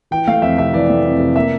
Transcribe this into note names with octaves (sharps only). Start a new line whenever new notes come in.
E3 G5
A3 F5
F2 E5
C3 E5
E3 D5
A3
F2
C3
A#3 E5